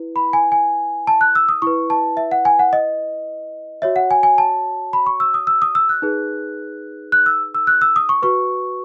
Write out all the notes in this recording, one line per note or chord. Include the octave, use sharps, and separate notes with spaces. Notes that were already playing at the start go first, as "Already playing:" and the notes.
Already playing: E4 B4
B5
G#5
G#5
A5
F#6
E6
D#6
E4 B4 C#6
A5
E5
F#5
G#5
F#5
D#5
F#4 C#5 E5
F#5
G#5
G#5
A5
B5
C#6
E6
D#6
E6
D#6
E6
F#6
D#4 G#4 B4
F#6
E6
E6
F#6
E6
D#6
C#6
F#4 B4 C#6